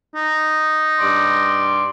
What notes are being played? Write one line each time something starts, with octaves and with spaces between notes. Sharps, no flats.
D#4
G2 D5 C6